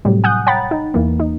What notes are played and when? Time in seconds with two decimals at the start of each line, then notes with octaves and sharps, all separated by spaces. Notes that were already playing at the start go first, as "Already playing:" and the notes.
0.05 A2 C3 F#3 G3
0.24 F#5 G#5 D#6 F#6 G6
0.46 C#5 F#5 G5 A#5 B5 A6
0.71 D#4
0.94 E2 E3 A#3
1.20 D#4